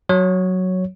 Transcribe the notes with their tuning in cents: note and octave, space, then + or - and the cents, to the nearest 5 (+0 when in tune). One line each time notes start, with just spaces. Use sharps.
F#3 +0 C#5 +0